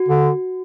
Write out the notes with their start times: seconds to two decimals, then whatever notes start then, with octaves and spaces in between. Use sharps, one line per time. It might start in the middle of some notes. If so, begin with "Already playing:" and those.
Already playing: F#4
0.08 D3